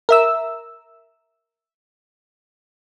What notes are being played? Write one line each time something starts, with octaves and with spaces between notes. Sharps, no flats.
A#4 E5 E6